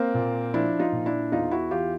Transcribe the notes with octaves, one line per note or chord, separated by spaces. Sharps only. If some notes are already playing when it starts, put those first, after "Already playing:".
Already playing: A#3 C4
A#2
F3 D4 E4
D#4 F4
A#2
D4 E4
E2 D#4 F4
E4 F#4
E3 F4 G4